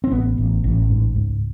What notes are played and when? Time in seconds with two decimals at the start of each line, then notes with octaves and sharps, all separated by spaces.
0.04 C4
0.11 A1 B3
0.38 A1
0.64 A1
0.90 G#2
1.16 C#2